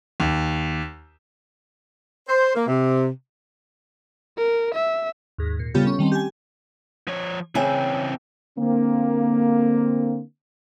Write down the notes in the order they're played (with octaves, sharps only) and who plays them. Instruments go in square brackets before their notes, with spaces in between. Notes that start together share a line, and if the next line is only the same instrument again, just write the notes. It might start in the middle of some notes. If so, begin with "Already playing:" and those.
[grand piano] D#2
[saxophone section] C5
A#3
C3
[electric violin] A#4
E5
[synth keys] D#2 G#2
A#2
C#3 G3 B3 F4 G4 A4
C#4
D#3 G3 A3 C4
G4 G#5
[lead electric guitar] F3 C#5
[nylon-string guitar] C#3 E5 G#5 [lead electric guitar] E3 C4 [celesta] C#5 G5
[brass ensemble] D3 A#3 C4